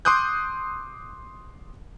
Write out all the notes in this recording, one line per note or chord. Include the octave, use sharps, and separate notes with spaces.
C6 D6 D#6 F#6 G6